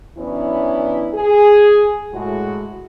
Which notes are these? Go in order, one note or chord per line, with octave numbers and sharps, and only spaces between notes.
E3 F#3 B3 C#4 D4 E4
G#4
A2 G#3 F#4